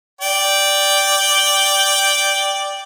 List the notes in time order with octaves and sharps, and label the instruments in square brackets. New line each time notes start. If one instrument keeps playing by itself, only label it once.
[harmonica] D5 G5